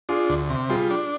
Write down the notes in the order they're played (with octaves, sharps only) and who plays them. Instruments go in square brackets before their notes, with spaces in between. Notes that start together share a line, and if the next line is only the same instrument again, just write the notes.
[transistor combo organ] D4 [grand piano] F4 G#4
[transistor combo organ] D2
C3
[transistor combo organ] G3 [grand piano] F4 G#4
[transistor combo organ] D4